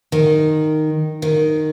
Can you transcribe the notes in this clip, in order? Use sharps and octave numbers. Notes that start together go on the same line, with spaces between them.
D#3
D#3